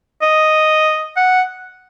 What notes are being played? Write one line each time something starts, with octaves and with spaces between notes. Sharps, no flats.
D#5
F#5